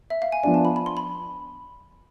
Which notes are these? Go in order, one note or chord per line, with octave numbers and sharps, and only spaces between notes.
E5
F5
G#5
F3 B3 D4 G#5
A5
B5
B5
C6
B5